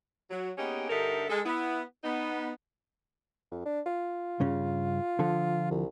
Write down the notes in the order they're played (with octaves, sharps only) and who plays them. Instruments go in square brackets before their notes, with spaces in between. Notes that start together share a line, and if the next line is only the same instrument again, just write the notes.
[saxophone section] F#3
A#3 B3 C#4 D#4 G4 G#4
G2 D3 D#4 A4 A#4 E5
G#3 A4
B3 E4
B3 D#4
[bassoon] F2
D4
F4
[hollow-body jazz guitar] G2 C#3 C#4
D3 F3 A4
[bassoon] C2